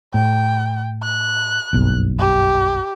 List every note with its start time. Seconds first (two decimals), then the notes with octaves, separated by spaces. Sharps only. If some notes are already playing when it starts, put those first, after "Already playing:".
0.14 A2 G5
1.03 F#6
1.73 F#1 B1 G2
2.19 G4